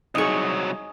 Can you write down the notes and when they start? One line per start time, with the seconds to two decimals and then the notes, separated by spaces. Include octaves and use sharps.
0.15 C2 F#3 D#4 G#4 D#5 C#6